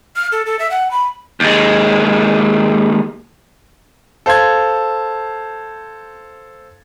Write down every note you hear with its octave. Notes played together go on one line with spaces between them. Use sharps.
F6
A4
A4
E5
F#5
B5
D#2 G#3
A4 C5 F5 C6 G#6